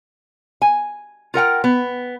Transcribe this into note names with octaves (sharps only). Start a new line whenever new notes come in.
G#5
F4 A#4 F#5 G5
B3